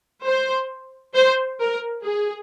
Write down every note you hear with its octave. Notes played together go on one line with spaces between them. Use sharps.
C5
C5
A#4
G#4